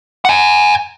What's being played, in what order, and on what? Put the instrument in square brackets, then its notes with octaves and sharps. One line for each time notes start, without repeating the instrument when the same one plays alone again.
[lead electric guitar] F#5 G#5